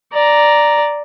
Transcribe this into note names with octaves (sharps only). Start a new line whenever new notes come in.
D5 A#5